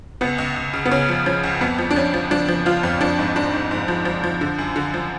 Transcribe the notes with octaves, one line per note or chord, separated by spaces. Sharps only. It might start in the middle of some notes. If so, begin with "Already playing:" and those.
C#2 B3
C#2
C#2
C#3
B3
C#3 C#4
F3
F3 C#4
C#2
F2 B3
F3
D4
F3 C#4
F3
F3 D4
F3
F3 F4
F2
F3 D4
G#2
G#2 D4
G#2
G#2
F3
F3
F3
D3
F#2
D3
F3